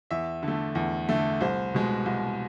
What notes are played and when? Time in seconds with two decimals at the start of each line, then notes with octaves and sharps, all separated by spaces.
0.11 E2 E5
0.43 D3
0.48 A3
0.75 E2
1.09 D3 A3
1.41 C2 C5
1.74 B2 G#3
2.06 C2